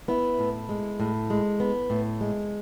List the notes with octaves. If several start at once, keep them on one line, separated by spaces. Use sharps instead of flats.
B3 E4
A2
G#3
A2
G#3
B3
A2
G#3